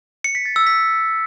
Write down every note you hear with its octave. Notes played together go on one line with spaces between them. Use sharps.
C#7
B6
A6
E6
B6